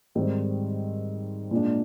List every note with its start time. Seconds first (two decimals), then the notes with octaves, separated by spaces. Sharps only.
0.15 G#2 D#3 G3 C4 D#4
1.51 A#2 G#3 D4